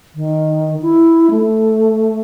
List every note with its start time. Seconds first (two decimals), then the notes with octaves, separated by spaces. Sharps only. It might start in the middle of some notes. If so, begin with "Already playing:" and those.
0.15 D#3
0.82 E4
1.31 A3